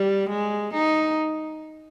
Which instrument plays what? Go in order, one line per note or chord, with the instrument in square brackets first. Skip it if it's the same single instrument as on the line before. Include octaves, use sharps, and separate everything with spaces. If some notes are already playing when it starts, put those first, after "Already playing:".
Already playing: [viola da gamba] G3
G#3
D#4